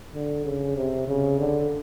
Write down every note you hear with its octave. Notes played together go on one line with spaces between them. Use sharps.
D3
C#3
C3
C#3
D3